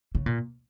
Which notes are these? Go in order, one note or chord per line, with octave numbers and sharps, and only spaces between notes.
C#3
A#2